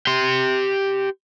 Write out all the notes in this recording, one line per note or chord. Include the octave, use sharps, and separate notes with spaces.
G4 C6